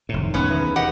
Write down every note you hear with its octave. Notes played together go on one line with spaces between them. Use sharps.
F1 A2 C3 D#3
E1 C#2 B3 C#4
E2 G#3 A#4 E5
E1 G4 D#5 F#5